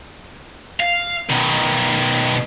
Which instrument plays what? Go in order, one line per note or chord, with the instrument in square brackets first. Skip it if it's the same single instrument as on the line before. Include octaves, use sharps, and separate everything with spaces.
[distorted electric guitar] F5
B2 D#3